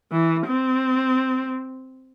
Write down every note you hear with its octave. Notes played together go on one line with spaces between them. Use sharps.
E3
C4